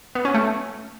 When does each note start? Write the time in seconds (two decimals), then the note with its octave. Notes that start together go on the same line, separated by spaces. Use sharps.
0.15 B3
0.25 C#4
0.35 A3